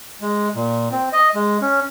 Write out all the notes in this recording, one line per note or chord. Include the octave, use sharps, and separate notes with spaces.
G#3
A#2
C4
D#5
G#3
C#4